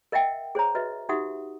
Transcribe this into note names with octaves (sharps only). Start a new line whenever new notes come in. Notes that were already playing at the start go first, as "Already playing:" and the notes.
A#4 D#5 E5 F#5 G5
G#4 C5 C#5 A#5
F#4 B4 D#5 E5
D#4 F#4 G4 E5 F#5 D#6